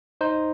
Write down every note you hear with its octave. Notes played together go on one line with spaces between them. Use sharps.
D#4 C5